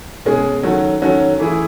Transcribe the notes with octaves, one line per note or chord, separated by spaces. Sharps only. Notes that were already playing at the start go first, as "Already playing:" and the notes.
B2 G#3 C#4 G#4
D#3 F#3 C#4 F#4 A4
D#3 F#3 C#4 F#4 A4
E3 A3 E4 G#4